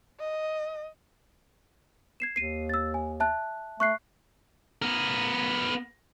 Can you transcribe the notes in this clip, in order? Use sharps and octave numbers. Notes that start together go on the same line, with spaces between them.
D#5
G#6 C7 E7
D#2 C7 D#7
E6 A6
G#5
E5 A5 F#6
A3 C#6 F#6 C7
B3 A#4